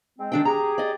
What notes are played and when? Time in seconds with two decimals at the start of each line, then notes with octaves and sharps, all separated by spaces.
0.18 G#3 C4
0.32 D#3 D4 G5
0.45 G4 G#4 A#5
0.78 D5 D#5